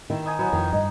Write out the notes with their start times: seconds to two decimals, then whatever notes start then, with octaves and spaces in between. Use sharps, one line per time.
0.10 D#3 E4
0.26 D#4 G#5 D#6
0.39 F#3 B3 D#4 G#5
0.53 F2 D#3 F3
0.73 G2 D#5